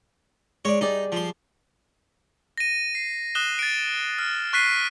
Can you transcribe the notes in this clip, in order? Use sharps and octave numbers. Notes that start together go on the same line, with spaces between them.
G#3 C#5 D5
G3 D#4 G#4 D5
F3 C6
A#6 D#7
C7
D#6 F#6 E7 G7
A6 D7
F6
C#6 F#6 B6 C7 D#7